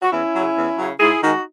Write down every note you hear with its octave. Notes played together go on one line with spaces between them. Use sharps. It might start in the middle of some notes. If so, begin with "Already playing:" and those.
F#4
E2 C#4 E4
C#3 F#3
E2
C#3 F#3
G#2 E4 G#4
D#3 G#3 D#4 F#4